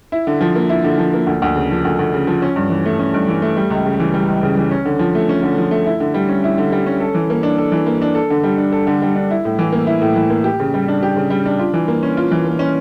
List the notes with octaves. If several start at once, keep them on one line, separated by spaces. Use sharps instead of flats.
E4
D3
F3
A#3
E4
D3
F3
A#3
D2
D2
C#3
F3
D2
D2
C#3
F3
C#4
G2
E3
A3
C#4
G2
E3
A3
G3
C#2
C#3
E3
G3
C#2
C#3
E3
C#4
D3
F3
A3
C#4
D3
F3
A3
E4
D3
G3
C#4
E4
D3
G3
C#4
A4
E3
A#3
D4
A4
E3
A#3
D4
A4
D3
G3
D4
A4
D3
G3
D4
E4
A2
E3
A#3
E4
A2
E3
A#3
G4
C#3
G3
D4
G4
C#3
G3
D4
F4
E3
A#3
C#4
F4
E3
A#3
C#4